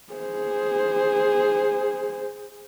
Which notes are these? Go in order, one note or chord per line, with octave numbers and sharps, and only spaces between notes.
G#4 C5